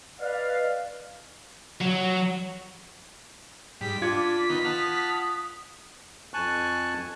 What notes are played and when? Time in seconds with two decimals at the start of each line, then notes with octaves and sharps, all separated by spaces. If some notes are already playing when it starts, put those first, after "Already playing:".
0.19 B4 D5 D#5 F5
1.81 F#3
3.81 G#2 G3 B6
4.02 D4 F4 D6 G#6 C#7
4.50 D#3 B3 D#4
4.64 F#5 A5 D#6 F6
6.33 F2 G#5 A5 C#6 F#6